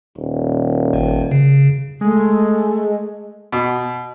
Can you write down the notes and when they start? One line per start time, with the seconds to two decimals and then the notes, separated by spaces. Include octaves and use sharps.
0.17 D#1
0.93 G#1
1.31 C#3
2.01 G#3 A3
3.52 B2